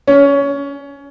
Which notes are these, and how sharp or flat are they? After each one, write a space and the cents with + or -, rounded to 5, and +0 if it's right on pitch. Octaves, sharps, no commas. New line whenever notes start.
C#4 +20